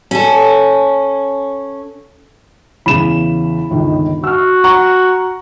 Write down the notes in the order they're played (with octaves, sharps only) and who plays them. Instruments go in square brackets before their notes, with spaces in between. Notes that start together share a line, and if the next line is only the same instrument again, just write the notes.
[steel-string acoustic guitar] C#4 A4
[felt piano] E2 C#3 E3 [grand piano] B5 E7
[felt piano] G1 C#2 D#3
[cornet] F#4 [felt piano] E6 F6
[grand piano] F#5 A#5 C#6